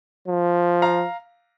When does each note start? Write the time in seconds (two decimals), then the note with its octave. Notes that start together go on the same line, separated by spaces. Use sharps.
0.27 F3
0.82 F5 A#5